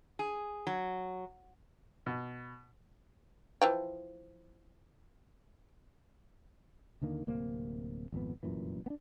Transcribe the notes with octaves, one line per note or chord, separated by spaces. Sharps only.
G#4
F#3
B2
E3 F3 G5
D#2 D3 D#3 A#3
D1 C3 A#3 C4
G#1 F2 A#2 B3
F1 F#2 A#2 E3
B3 D4